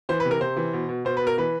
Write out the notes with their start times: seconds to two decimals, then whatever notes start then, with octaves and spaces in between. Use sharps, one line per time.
0.09 E3 C5
0.20 B4
0.25 C3
0.31 A#4
0.40 C3 C5
0.56 E3
0.73 B2
0.89 B2
1.05 B2 C5
1.17 B4
1.21 B2
1.27 A#4
1.38 E3 B4